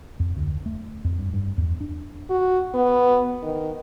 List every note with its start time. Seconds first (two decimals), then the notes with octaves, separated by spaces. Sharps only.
0.20 F2
0.36 D2
0.66 A3
1.04 F2
1.19 G2
1.33 G2
1.58 E2
1.81 D4
2.30 F#4
2.74 B3
3.43 D#3